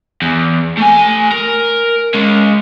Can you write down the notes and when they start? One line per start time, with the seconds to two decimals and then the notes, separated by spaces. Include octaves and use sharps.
0.22 E2
0.77 A3 G#5
1.32 A#4
2.14 G#3 C#4